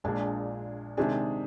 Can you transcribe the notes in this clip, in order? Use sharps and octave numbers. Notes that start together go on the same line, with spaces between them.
A#1 A#2 G#3 D4 G#4
C3 D#3 G#3 D4 G#4